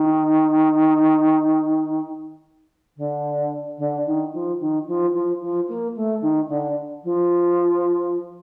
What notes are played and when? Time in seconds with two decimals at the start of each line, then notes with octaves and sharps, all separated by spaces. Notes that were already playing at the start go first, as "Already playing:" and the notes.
Already playing: D#3
2.97 D3
3.78 D3
4.06 D#3
4.33 F3
4.60 D#3
4.87 F3
5.14 F3
5.41 F3
5.68 A#3
5.95 A3
6.22 D#3
6.48 D3
7.04 F3